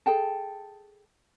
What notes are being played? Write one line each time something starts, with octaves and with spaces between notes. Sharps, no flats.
G#4 A4 G5 A5